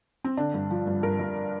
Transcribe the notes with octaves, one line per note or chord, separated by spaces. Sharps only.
C4
D3 D4
G2
F3
G2
G2 A#4
G2